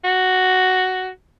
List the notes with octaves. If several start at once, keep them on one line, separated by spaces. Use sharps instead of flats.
F#4